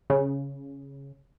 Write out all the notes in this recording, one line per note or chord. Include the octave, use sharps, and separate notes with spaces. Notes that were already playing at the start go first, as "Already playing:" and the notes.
C#3